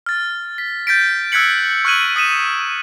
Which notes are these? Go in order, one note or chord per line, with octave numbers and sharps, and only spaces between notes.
F6 A6
B6
G6 A6 B6 D7
E6 F#6 G#6 B6 C#7 F#7
C#6 F6 F#6 G#6 D#7 F#7
D#6 B6 D#7 E7